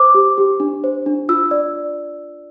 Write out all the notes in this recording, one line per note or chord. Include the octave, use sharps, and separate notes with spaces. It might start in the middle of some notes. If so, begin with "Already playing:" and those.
Already playing: C5 D6
G4
G4
D4
C5
D4
F4 E6
D5